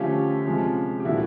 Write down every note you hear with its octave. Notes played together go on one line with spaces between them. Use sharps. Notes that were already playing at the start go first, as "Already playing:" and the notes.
Already playing: D3 F3 A3 C#4 F4 G4
C3 F3 G#3 C#4
G4
A#2 F3 A3 D4 E4 F#4